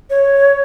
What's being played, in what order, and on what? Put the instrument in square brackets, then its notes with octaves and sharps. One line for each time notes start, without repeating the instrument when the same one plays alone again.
[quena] C#5